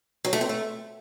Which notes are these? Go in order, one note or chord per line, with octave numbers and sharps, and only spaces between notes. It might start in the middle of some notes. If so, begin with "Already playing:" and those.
F#3
A3
C4
A3